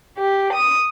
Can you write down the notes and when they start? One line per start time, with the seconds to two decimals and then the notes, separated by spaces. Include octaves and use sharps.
0.17 G4
0.52 D#6